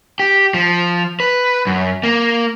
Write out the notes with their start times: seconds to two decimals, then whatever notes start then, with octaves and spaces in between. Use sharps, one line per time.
0.19 G4
0.54 F3
1.20 B4
1.67 F#2
2.03 A#3